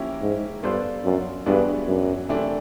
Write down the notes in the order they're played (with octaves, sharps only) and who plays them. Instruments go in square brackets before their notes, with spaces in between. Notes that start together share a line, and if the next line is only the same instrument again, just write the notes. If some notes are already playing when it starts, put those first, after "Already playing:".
Already playing: [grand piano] F3 A#3 C#4 E4 G4
[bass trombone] G#2
[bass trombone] G2 [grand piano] B3 D4 F4 A4 C5
[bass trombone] F#2
[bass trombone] G2 [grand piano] E3 G#3 B3 D4 F#4
[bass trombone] F#2
[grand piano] C3 E3 A3 D4 G4